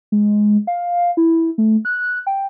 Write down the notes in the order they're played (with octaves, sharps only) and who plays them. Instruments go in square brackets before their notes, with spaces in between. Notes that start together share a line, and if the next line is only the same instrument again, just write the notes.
[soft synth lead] G#3
F5
E4
A3
F#6
G5